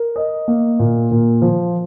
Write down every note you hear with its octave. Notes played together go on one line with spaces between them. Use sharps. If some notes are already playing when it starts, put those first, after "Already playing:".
Already playing: A#4
D#5
A#3
A#2
A#2
F3